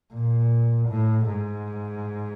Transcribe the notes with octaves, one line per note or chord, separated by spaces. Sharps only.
A#2
A2
G#2